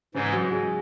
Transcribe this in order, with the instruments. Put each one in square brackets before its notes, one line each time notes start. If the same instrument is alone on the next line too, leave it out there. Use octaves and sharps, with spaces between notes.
[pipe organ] G#2 E3 G#3 [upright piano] C#3 C#4
[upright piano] F#3 F#4
G#3 G#4